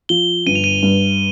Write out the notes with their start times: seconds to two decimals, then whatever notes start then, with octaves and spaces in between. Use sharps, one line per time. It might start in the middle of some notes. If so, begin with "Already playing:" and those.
0.09 F3 G7
0.46 G1 D#7
0.55 F7
0.64 D#7
0.82 G2